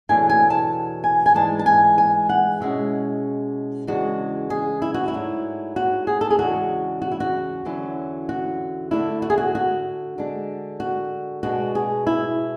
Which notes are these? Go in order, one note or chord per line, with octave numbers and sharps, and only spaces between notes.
E2 B2 F#3 A3 D4 G#5
G#5
A5
G#5
G#5
G#2 E3 G#3 D4 A5
A5
G#5
G#5
F#5
B2 G#3 C#4 E4 E5
E2 C#3 G#3 D4 F#4
G#4
E4
F#4
E4
G#2 F#3 A3 D4
F#4
G#4
A4
G#4
E2 C#3 G#3 D4 F#4
F#4
E4
F#4
E2 D3 F#3 C#4 E4
F#4
D3 A3 D4 E4
F#4
G#4
F#4
F#4
D3 G#3 D4
F#4
B2 G#3 D4 F#4
G#4
E4